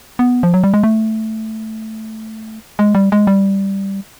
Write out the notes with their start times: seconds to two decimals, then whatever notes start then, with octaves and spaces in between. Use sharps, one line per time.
0.19 B3
0.43 F3
0.54 F#3
0.64 G3
0.74 G#3
0.84 A3
2.79 G#3
2.95 G3
3.12 G#3
3.27 G3